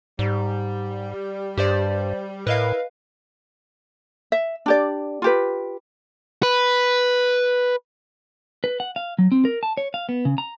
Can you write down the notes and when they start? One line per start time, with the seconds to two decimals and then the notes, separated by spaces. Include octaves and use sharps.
0.19 G#2 G3
1.57 G2 G4 C5 D5
2.47 A2 E4 A#4 B4 D#5 F5
4.32 E5
4.66 D4 G4 D5
5.22 F4 G4 B4
6.43 B4
8.64 B4
8.80 F#5
8.96 F5
9.19 F#3
9.32 C4
9.45 A#4
9.63 A5
9.77 C#5
9.94 F5
10.09 B3
10.25 C#3
10.38 A#5